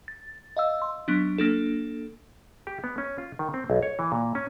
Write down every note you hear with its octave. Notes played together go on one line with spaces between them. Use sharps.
A6
D#5 F5 E6
C6
F#3 B3 D4
A#3 D4 A4
G4
B3
C#4
F4
D#3
C4
B1
C#5
E3
A#2
C#4